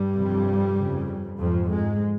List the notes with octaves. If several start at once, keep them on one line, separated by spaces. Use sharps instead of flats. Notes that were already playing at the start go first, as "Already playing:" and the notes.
Already playing: G2 G3
F2 C3
F2 C#3
F2 G#2 F3
G#2 G#3